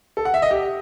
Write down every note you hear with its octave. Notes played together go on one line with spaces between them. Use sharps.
A4
F#5
E5
D#5
G4